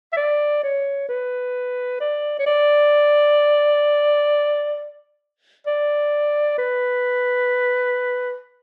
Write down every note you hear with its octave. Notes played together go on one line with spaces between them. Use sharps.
E5
D5
C#5
B4
D5
C#5
D5
D5
B4